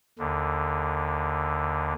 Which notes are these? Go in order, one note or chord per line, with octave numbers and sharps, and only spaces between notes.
D#2 D3